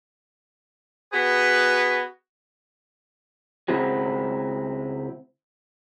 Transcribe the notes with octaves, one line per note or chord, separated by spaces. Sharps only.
B3 F#4 G#4 B4
C#2 G#3 C4 E4 F#4